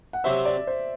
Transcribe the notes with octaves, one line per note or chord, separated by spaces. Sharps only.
F#5
C3 F#3 C4 F#4 C5 E5
D5
C5